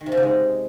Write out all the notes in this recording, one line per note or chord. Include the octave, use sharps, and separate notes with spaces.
D#3
C3
C#3
C3
G#3